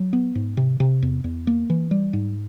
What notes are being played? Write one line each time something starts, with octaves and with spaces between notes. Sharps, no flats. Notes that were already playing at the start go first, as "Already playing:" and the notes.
Already playing: F#3
B3
G#2
C3
C3
E2
E2
A#3
E3
G3
G#2